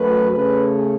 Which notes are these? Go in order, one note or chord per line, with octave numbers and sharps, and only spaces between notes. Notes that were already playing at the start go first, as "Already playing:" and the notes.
Already playing: F#2 F#3 A3 B4
C#3 A3 C#4 B4